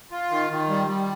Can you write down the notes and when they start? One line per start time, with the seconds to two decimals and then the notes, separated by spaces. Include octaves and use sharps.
0.11 F4
0.30 D#3
0.50 D#3
0.69 G3
0.87 G3